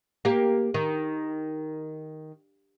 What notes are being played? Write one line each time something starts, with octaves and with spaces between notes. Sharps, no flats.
A#3 G4
D#3